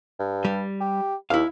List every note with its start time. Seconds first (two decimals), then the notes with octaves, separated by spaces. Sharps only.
0.19 G2
0.45 G3
0.81 G4
1.30 D#2 E4 F5